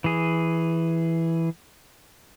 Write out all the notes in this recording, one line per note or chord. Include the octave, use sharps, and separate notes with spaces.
E3 G#4